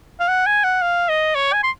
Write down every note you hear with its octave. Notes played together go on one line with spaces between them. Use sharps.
F5
F#5
G#5
F#5
F5
D#5
C#5
G#5
C6